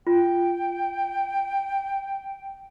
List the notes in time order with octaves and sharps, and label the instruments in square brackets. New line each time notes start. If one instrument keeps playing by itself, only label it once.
[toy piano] F4 [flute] G5